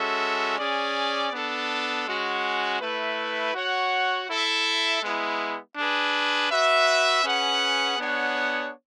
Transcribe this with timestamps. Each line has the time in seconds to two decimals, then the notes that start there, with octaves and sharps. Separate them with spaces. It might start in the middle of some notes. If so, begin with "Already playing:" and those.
Already playing: G#3 C#4 F#4 A4 E5
0.59 C#4 G#4 D5
1.33 B3 D4 A4
2.07 G#3 C#4 F#4
2.81 A3 E4 B4
3.55 F#4 C#5 F#5
4.29 E4 A4 E5
5.03 G#3 B3 E4
5.77 D4 G#4 B4
6.50 F#4 B4 E5
7.24 C#4 G#4 B4 F#5
7.98 B3 D4 G#4 C#5 F#5